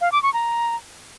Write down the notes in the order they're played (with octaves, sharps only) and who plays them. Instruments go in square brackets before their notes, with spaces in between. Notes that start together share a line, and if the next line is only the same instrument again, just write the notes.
[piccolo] F5
D6
C#6
A#5